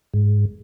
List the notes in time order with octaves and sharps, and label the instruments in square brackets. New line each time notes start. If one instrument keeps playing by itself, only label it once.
[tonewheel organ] G#2